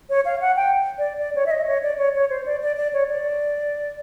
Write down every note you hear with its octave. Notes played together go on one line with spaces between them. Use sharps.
C#5
F5
F#5
G5
D5
D5
C#5
E5
D#5
C#5
D5
C#5
C#5
C5
D5
D5
D5
C#5
D5